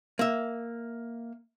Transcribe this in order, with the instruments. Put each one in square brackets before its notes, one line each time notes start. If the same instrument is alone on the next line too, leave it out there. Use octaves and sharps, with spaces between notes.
[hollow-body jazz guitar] A#3 E5